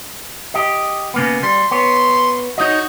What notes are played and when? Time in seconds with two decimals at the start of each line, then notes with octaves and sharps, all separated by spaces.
0.54 G4 D#5
1.14 C#3 A#3 B3
1.43 G3 C6
1.71 B3 C#5 C6
2.58 D#4 F#4 C#5 D#5